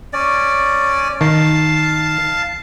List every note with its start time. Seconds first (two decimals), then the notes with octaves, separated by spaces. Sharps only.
0.13 C#4 D5
1.21 D#3 F5 A5